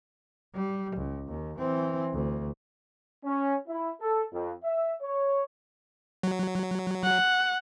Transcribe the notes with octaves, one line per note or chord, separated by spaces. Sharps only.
G3
C#2
D#2
E3 C4
D2
C#4
E4
A4
F2
E5
C#5
F#3
F#5